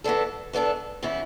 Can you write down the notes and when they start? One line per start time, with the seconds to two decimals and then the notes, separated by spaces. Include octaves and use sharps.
0.04 E3 B3 D4 A4
0.53 E3 B3 D4 A4
1.03 C#3 E3 B3 E4